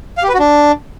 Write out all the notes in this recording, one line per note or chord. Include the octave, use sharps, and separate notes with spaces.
F5
G4
B4
F#4
D4